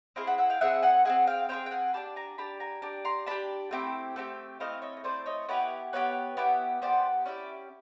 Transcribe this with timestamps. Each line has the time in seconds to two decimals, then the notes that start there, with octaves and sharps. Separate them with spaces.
0.16 C4 E4 G#4 D#5 F5
0.27 E5 F#5
0.38 E5 F#5
0.50 F5 G5
0.61 C4 E4 G#4 E5 F#5
0.82 F#5 G#5
1.05 C4 E4 G#4 F#5 G#5
1.27 F5 G5
1.49 C4 E4 G#4 F5 G5
1.66 G5
1.71 F#5 G#5
1.93 D4 G4 A5 B5
2.16 G#5 A#5
2.38 D4 G4 A5 B5
2.60 G#5 A#5
2.82 D4 G4
3.05 A#5 C6
3.26 D4 G4 A5 B5
3.71 A3 C4 E4 G4
4.16 A3 C4 E4 G4
4.60 A3 C4 E4 D#5 F5
4.82 C#5 D#5
4.97 D#5
5.04 A3 C4 E4 C5 D5
5.26 C#5 D#5
5.49 B3 E4 G4 B4 C#5
5.93 B3 E4 G4 B4 C#5
6.37 B3 E4 G4
6.82 B3 E4 G4 C5 D5
7.25 C#4 E4 G4 D5 E5